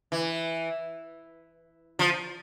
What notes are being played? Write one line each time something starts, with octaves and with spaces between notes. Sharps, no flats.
E3
F3